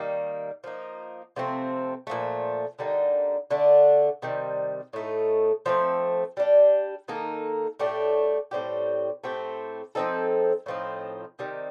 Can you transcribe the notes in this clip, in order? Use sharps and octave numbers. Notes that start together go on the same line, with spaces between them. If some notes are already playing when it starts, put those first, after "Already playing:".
Already playing: D#3 G3 A#3
F3 A#3 D#4
C3 F3 A3 C4
A#2 F3 A3
D3 G3 A#3 D#4
D3 A3 D4
C3 D#3 G3
A2 A3 D#4
F3 A3 C4
G3 D4 G4
D#3 A#3 D#4 A4
A2 A3 D4 G4
A2 G3 C4 G4
A2 A3 C4 G4
F3 C4 D#4 A4
A2 F3 C4 D#4
C3 D#3 G3